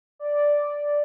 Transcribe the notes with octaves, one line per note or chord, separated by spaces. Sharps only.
D5